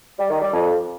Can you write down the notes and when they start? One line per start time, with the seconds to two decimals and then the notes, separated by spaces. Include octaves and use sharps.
0.19 G3
0.30 D#3
0.42 G3
0.53 F2